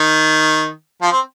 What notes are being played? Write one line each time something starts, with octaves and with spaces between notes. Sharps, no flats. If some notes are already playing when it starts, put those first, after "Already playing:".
Already playing: D#3
F3
C4